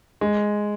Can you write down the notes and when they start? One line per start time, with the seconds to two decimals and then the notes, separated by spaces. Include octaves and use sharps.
0.21 G#3